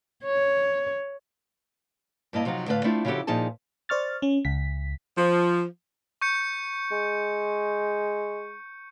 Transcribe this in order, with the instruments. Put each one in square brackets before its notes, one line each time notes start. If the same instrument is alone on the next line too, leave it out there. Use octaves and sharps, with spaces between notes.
[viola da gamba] C#5
[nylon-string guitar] G2 A#3 E4 D#5 A5
C3 F3 F#3 D4 D#4 F4
A2 D3 A3 B4 D5 F5
A3 C4 D4 E4 F4
C#3 F3 E4 F#4 G4 A4
A#2 F3 D#4 G#4 A5
[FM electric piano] C5 D5 C#6 F6 A6
C#4
C#2 B6
[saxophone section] F3
[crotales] C#6 G6 C#7
[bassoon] G#3